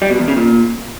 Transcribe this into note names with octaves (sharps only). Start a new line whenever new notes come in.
G3
B2
E2
C#3
A#2